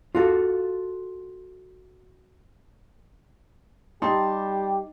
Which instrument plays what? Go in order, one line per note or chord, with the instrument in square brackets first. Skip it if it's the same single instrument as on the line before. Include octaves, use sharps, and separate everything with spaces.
[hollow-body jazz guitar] F4 F#4 A4
[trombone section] G3 G4 [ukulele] D#4 [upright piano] A5 C6